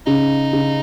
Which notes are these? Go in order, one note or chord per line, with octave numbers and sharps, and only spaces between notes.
C#3 D#4
C#3